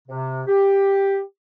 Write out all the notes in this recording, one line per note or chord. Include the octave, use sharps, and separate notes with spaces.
C3
G4